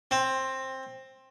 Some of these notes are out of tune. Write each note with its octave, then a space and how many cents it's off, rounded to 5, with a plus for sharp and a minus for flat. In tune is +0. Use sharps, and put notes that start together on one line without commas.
C4 +15